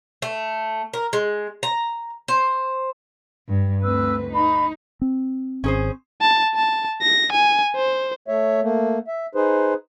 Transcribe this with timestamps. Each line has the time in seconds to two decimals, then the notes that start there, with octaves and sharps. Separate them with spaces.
0.22 A3
0.93 A#4
1.13 G#3
1.63 A#5
2.28 C5
3.48 G2
3.83 D2 C4 B4 E6 F#6
4.33 D#4 B5
5.02 C4
5.64 G#1 C#4 G#4 C5
6.21 A5
6.55 A5
7.02 A#6
7.32 G#5
7.76 C5
8.28 A3 C#5 E5
8.62 A3 A#3
9.08 E5
9.35 D#4 G#4 B4 C5